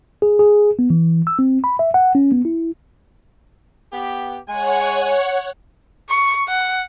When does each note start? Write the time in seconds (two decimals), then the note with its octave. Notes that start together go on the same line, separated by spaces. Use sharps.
0.22 G#4
0.39 G#4
0.79 B3
0.90 E3
1.27 E6
1.39 C4
1.64 B5
1.79 E5
1.94 F#5
2.15 C#4
2.32 B3
2.45 E4
3.92 B3 G4
4.48 G#3 C#5 F#5 G#5
6.09 C#6
6.49 F#5